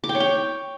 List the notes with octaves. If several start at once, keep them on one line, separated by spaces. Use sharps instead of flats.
D6
G5
C#5
G5